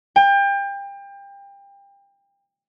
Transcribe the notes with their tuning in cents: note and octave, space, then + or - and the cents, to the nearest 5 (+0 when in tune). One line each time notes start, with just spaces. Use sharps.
G5 +30